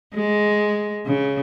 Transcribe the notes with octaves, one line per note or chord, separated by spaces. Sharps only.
G#3
C#3